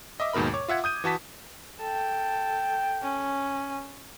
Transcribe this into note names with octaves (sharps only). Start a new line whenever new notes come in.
D#5 E5 D6
D#2 G#2 B2 A#4 B5
C#5 D6
F4 E5 F#5 G#6
D#6 G6 D#7
E3 F#4 A5 B6
A4 G5
C#4